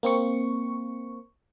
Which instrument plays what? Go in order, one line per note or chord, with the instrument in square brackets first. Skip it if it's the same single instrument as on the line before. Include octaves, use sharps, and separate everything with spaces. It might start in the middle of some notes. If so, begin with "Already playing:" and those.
[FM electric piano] A#3 C4 C#6